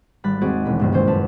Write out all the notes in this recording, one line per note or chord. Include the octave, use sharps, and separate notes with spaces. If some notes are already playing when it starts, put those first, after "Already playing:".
G#1 G3 B5 F#6 A6
D#2 C4 F#4 G#4 D5
E1 A#1 B5
C#2 G2 A#3
D#1 C#4 C5
F#2 B4 A5